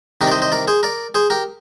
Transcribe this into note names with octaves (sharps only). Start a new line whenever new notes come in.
C2 C3 D#3 G4 A#4
D5
C5 D#5
C5 D#5
A#4 D5
G#4 C5
A#4 D5
G#4 C5
G4 A#4